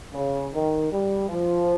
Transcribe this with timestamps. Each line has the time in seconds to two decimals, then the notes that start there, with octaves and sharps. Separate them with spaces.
0.13 C#3
0.53 D#3
0.92 G3
1.29 F3